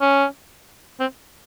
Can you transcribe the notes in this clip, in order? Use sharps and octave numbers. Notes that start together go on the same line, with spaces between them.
C#4
C4